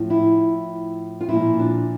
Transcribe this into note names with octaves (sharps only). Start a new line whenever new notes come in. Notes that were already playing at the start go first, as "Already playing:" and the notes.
Already playing: A2 F3
E4
F4
A#2 F3 E4
D4